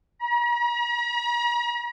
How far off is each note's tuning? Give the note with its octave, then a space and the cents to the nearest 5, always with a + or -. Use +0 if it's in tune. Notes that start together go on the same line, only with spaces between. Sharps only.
A#5 +45